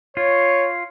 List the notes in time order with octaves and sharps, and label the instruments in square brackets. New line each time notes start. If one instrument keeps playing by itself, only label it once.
[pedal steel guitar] F4 [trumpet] C#5